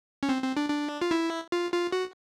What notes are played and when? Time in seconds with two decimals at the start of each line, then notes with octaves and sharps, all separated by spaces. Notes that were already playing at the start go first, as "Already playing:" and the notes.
0.23 C#4
0.29 C4
0.42 C4
0.57 D4
0.70 D4
1.01 F4
1.11 E4
1.52 F4
1.72 F4
1.92 F#4